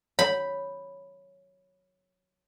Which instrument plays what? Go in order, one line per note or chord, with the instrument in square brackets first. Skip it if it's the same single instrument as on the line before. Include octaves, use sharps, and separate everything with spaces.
[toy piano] C#5 [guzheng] B5